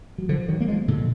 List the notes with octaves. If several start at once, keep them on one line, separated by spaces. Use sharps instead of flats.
F#3
D3 F3
D#3 F#3
A#3
F3 G#3
A#2 D3